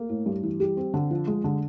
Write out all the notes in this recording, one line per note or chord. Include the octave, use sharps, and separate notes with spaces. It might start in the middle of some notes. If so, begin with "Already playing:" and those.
Already playing: A#3
A2
G2
E3
G3
C4
D3
F3
G#3
D3